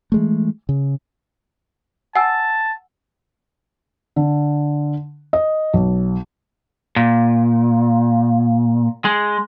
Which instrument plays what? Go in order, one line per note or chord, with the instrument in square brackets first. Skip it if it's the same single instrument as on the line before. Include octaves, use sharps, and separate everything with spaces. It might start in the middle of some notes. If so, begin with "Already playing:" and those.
[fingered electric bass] E3 G#3 A3
C#3
[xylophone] F#5 G#5 E6 [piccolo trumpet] A5
[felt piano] D3
D#5
B1
[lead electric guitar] A#2
G#3